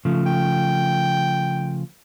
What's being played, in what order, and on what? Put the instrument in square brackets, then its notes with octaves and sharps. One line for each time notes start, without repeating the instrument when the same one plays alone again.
[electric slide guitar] C#3 F3 A3
[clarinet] G5